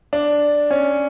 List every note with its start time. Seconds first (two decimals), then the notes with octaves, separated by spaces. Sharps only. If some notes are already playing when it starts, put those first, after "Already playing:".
0.13 D4
0.71 C#4